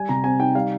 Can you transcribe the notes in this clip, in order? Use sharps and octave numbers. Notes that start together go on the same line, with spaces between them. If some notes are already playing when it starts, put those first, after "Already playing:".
Already playing: G3 G#5
C3 A#5
C4 G#5
D#4 G5
G3 F5